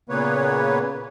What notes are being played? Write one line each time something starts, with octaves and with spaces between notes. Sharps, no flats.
A#2 C#3 A#3 B3 B4 C#5